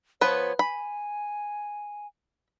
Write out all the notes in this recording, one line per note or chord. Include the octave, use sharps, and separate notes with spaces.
F3 B3 B4 C#5
G#5 B5